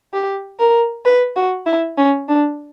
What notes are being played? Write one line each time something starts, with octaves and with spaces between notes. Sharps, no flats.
G4
A#4
B4
F#4
E4
C#4
D4